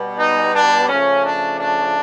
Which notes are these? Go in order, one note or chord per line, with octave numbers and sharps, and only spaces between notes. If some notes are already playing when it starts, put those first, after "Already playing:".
Already playing: B2 G3 B3
D#4
D4
C#3 F3 A3 C#4
D4
D4